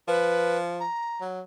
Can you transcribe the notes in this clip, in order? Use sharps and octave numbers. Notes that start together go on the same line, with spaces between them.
F3 B4
A#5
F#3